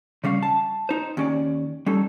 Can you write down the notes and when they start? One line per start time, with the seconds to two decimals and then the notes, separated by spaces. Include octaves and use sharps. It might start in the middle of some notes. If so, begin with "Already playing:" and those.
0.24 C#3 G3 C#4 F5
0.43 A5
0.89 D#4 C5
1.17 D#2 C#4 D5
1.86 G3 C#4 D#4 A4